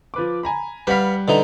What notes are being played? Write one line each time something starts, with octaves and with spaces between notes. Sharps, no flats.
F3 B4 D6
G#5 A#5 B5
G3 B4 F5 F#5 B6
D3 E3 D#4